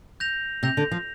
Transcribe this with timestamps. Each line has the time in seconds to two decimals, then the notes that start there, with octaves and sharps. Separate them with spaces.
0.20 G6 A#6 F7
0.63 C3 G6 A#6 F7
0.77 D3
0.91 F3